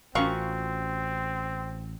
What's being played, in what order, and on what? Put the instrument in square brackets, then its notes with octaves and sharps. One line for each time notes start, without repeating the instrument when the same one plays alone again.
[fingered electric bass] A1 [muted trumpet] C4 [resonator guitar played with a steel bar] C#4 F4 F#4 [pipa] A#4 F5 C#6